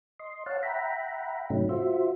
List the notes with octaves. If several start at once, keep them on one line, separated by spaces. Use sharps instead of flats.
D#5 C6
C#5 F5 F#5 A5
E5 F#5 G5 A#5 B5
G#2 C3 F#3 A3 C#4 D#4
F4 F#4 C5 E5